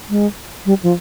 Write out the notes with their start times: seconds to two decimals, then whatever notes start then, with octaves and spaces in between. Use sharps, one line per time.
0.10 G#3
0.66 G3
0.83 F3